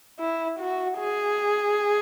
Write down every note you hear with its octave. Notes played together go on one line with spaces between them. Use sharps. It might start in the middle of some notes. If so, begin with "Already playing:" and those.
E4
F#4
G#4